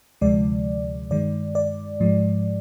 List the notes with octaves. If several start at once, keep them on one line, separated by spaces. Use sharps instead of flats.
D2 C3 F3 G#3 D5
G2 D#3 G#3 D5
D5
G#2 F3 G#3